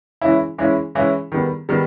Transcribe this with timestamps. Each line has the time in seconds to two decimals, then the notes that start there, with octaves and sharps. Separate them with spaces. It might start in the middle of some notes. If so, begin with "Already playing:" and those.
0.22 E3 G#3 C#4 E4
0.58 E3 G#3 C#4 E4
0.95 E3 G#3 C#4 E4
1.32 D#3 G3 B3
1.69 D#3 G3 B3